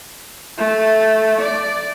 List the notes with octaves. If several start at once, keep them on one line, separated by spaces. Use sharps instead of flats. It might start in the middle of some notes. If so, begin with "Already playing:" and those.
A3
D5